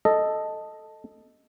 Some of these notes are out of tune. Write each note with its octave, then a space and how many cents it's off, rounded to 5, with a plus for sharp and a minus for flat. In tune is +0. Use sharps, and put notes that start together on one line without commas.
A4 +0 D#5 +0